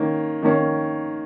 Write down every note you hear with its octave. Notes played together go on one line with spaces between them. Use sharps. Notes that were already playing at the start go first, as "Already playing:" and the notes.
Already playing: D#3 A#3 C#4
D#3 A#3 C#4